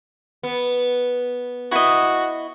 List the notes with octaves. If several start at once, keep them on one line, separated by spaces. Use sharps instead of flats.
B3
E4 F#4 D#5